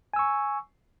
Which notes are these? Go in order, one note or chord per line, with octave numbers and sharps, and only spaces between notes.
G#5 C#6 E6